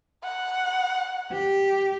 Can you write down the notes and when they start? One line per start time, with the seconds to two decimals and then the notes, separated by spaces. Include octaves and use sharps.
0.24 F#5
1.32 G4